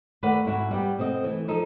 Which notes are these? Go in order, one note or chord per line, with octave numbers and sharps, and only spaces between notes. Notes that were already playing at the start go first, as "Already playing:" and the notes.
D#2 A3 B4 D5 F#5
G#2 E4 F#4
G3 B3 G4
B2 C4 A4 D#5
E3 A3
F3 D#4 A4